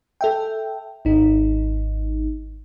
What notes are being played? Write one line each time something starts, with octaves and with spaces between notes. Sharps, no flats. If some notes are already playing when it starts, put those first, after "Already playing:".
A4 E5 G5
G#1 D#4